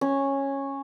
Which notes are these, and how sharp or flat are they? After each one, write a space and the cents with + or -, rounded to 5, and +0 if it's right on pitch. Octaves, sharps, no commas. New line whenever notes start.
C#4 -10